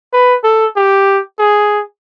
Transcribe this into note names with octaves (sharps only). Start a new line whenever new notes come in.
B4
A4
G4
G#4